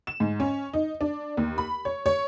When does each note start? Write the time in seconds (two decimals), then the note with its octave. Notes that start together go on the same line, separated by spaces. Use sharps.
0.07 E7
0.20 G#2
0.40 C#4
0.73 D#4
1.01 D4
1.37 D#2
1.58 B5
1.85 C#5
2.06 C#5